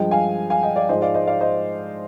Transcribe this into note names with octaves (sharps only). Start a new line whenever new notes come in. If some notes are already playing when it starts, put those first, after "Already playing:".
Already playing: G2 F3 G#3 D#5 G5
F5 G#5
F5 G#5
D#5 G5
D5 F5
G#2 F3 G#3 C5 D#5
D5 F5
C5 D#5
D5 F5
C5 D#5